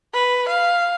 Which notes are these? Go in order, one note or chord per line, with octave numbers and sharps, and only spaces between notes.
B4
F5